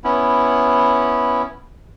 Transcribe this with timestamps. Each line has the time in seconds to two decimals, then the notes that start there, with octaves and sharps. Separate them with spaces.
0.04 B3 C#4 E4